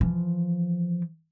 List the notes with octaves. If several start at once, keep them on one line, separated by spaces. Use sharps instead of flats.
E3 F3